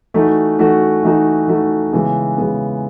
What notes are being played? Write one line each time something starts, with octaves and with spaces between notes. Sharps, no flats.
E3 A3 D#4 F#4
E3 A3 D#4 F#4
E3 A3 D#4 F#4
E3 A3 D#4 F#4
C#3 E3 G#3 B3
C#3 E3 G#3 B3